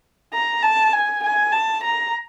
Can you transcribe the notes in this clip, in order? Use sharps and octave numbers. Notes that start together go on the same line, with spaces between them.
A#5
A5
G#5
G#5
A5
A#5